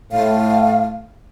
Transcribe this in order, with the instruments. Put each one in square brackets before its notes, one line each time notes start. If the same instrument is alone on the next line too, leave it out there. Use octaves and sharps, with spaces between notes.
[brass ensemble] A2 [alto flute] F5